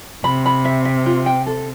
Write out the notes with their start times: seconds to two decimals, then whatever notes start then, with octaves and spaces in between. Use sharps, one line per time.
0.24 C3 B5
0.46 B5
0.65 E5
0.85 E5
1.06 F4
1.26 G5
1.46 A4